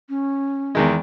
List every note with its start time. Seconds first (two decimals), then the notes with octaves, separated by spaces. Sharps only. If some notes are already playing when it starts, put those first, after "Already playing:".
0.09 C#4
0.75 E2 D#3 G#3